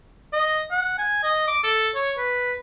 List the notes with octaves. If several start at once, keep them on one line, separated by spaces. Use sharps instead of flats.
D#5
F#5
G#5
D#5
D6
A4
C#5
B4